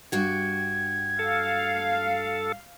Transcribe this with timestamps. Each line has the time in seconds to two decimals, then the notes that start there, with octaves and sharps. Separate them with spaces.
0.12 G2 F#4 G5 G#6
1.19 A4 F5